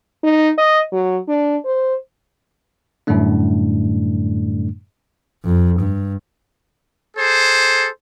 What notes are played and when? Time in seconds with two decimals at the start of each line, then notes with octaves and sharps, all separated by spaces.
0.23 D#4
0.58 D#5
0.92 F#3
1.28 D4
1.65 C5
3.07 F#2 A2 D3 G3 A3 D4
5.44 F2
5.79 G2
7.17 G#4 A4 C5